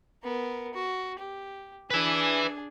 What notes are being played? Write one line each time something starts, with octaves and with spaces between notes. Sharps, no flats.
B3 A#4
F#4
G4
D4 G#4 B4 E5